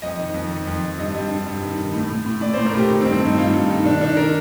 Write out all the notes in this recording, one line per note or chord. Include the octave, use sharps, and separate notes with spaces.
F2 D#5
D#3
F2
D#3
F2
F2
G2 D#5
G2
G2
G2
D#3
D#3
A2
A2
A2
A2 D5
A2 C5
A#4
A2 G4
D#3
C4
G2
C4
G2 D#4
G2 F4
G2
D#3
D#3 D4
D#3 D4
D#3 A#4